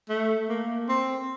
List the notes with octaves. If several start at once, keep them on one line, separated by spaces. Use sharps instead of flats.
A3
A#3
C4